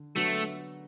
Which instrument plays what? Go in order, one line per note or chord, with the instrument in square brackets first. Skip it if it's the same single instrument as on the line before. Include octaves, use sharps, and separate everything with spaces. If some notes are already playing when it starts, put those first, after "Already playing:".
Already playing: [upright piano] D3
[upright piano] D3 F#3 B3 F#4 [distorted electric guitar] A3